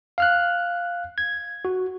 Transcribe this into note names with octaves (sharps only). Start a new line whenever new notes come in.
F5 F6 F#6
G#6
F#4